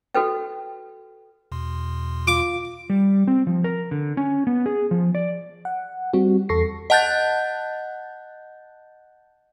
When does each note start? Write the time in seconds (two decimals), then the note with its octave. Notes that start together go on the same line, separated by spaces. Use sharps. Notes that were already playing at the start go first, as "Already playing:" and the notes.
0.14 F#4 A4 B4 G5
1.52 E2 B2 C6
2.27 F4 D6
2.90 G3
3.28 C4
3.47 F3
3.64 A#4
3.91 D3
4.17 C#4
4.47 B3
4.66 G#4
4.91 F3
5.15 D5
5.65 F#5
6.13 G3 C4 F#4
6.49 E2 A4 C#6 A#6 C7
6.90 D#5 F#5 A5 F#6 G6 A6